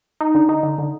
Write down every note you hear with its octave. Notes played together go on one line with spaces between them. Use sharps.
D#4
D3
D#4
D3
D3